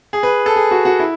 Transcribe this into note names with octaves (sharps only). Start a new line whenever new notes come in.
G#4
B4
A4
G#4
F#4
F#4
E4